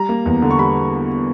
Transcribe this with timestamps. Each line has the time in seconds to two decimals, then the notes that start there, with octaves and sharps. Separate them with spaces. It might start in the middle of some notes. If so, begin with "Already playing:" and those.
Already playing: G3 A#5
0.09 A#3
0.26 E2
0.42 D3
0.51 C#6
0.59 G3 B5